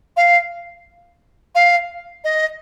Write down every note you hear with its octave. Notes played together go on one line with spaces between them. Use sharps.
F5
F5
D#5